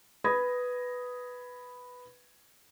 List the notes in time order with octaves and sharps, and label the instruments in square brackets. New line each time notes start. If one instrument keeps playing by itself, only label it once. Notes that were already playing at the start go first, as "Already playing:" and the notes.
[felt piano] B4 B5 D#6 G#6 A#6